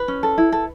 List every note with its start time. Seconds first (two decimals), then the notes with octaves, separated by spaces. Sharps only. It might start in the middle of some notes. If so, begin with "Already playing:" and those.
Already playing: B4
0.08 C#4
0.23 A4
0.38 E4
0.52 A4